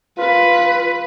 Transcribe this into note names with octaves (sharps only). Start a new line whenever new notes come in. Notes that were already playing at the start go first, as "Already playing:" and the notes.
F4 B4